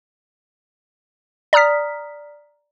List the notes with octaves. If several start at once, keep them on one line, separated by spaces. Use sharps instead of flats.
D5 A#5 D#6 F6 B6